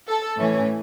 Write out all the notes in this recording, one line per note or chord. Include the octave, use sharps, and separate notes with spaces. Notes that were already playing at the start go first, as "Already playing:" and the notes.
A4
A2 E3 A3 C#4